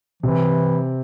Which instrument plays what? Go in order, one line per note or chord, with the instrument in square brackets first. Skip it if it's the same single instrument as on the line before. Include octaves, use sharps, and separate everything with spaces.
[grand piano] C3 [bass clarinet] E3